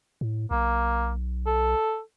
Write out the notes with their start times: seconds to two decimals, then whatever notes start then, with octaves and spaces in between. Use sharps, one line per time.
0.21 A2
0.51 B1 A#3
1.46 A4